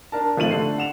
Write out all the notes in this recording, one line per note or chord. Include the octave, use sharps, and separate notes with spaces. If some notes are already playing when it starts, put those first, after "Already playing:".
D4 A#4 A5
G#1 F3 A3 D#7 F#7
D3 A3 D4 A4 C7
F#5 E7 F7